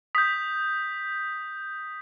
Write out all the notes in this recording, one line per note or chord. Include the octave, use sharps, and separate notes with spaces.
D#6 G6 B6